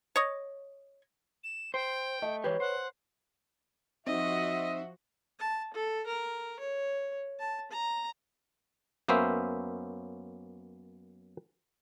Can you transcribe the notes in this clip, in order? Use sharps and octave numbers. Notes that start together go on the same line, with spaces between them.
C#5 D#5
E7
C5 G5
A3 D#5
E3 G#3 G4 B4 C#5
C5 F#5
F3 C4 D#4 F#4 C5 D#5 E5
A5
A4
A#4
C#5
A5
A#5
F#2 A#3 B3 C#4 C5 E5